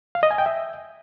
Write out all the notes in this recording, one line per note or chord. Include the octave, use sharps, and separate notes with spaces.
F5
D#5
G#5
G5
E5